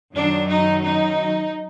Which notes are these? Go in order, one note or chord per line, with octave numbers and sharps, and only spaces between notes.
F#2 D#3 F#3 D4
D#4
D#4